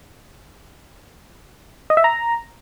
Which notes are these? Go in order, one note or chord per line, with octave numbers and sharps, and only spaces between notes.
D#5
E5
A#5